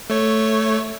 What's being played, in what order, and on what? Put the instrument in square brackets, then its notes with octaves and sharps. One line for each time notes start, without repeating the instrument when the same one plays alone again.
[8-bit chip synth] A3 C#5